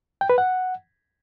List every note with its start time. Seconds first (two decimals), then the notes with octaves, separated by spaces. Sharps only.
0.21 G5
0.30 B4
0.38 F#5